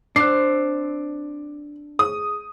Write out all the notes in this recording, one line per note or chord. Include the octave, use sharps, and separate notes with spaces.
C4 D4 D6 F#6 C7
G#4 D#6